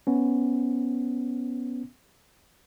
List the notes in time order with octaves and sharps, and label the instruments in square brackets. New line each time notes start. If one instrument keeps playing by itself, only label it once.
[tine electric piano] B3 C#4